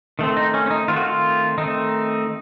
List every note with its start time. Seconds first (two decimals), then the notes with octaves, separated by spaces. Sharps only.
0.19 D#3 A3 C4
0.37 D#4
0.54 C#4
0.66 C#4
0.70 D#4
0.88 D#3 A3 C4 F4
0.96 F#4
1.05 F4
1.58 D#3 A3 C4 D#4